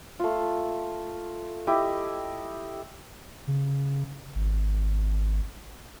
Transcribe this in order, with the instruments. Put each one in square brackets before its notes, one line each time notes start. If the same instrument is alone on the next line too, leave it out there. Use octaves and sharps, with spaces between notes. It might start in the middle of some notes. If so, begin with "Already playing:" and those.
[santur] A3 F4
E4 G4 D#5
[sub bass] C#3
G#1